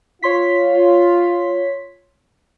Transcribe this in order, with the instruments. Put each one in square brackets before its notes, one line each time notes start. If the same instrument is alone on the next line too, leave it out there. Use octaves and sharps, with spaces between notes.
[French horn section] F4 [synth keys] C#5 C6 B6